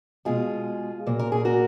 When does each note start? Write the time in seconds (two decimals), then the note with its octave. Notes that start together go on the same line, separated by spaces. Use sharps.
0.25 B2 G#3 F4 G#4
1.06 A#2 F#3 A#3
1.19 A#4
1.32 G#4
1.45 F#4 A#4